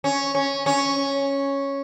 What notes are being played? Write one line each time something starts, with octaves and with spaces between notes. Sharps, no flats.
C#4
C#4
C#4